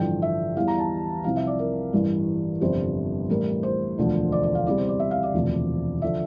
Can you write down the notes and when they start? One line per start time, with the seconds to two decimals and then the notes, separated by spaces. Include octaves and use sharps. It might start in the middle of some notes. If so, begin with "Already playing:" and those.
Already playing: A1 G2 D3 F3 G5
0.22 E5
0.56 E2 E3 G3 F5
0.68 A#5
0.78 A5
1.24 C2 C3 F3 F5
1.36 E5
1.47 D5
1.59 A#4
1.93 A1 G2 E3 G3
2.61 G1 F2 C3 G3 C5
3.29 A1 A2 G3 A#4
3.63 C5
3.98 E1 D2 D3 F3
4.32 D5
4.43 D5
4.55 F5
4.66 E2 C3 G3 D5
4.78 C5
4.88 D5
4.99 E5
5.11 F5
5.23 D5
5.34 E1 D2 C3 F3
6.02 D3 F3 E5